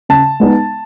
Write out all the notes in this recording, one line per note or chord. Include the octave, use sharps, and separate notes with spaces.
C#3 A5
G#3 B3 D#4